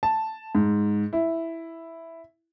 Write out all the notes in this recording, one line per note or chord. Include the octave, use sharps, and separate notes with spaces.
A5
G#2
E4